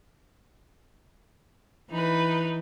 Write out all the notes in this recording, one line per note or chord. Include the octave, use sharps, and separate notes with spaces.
E3 D#4 B4